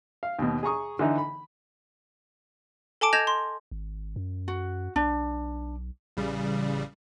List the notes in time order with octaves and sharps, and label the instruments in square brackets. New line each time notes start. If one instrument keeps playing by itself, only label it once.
[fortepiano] F5
D#2 B2
G#4 A#5 C#6 D#6
D3 E3 D#4
B5
[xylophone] A4 G#5 A5 D6 D7
D#5 G6 G#6 A#6 E7 F7
C6
[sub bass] G#1
F#2
[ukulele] F#4
[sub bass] B1 [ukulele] D4
[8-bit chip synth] A1 C#3 G3